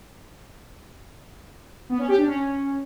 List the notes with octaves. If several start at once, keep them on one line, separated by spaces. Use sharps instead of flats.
B3
C#4
G4
D4
C#4